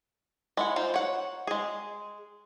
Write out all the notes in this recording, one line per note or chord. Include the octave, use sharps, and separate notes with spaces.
G#3 E4 F#5
D#4 F4 C5
C#5 F#5
G#3 G#4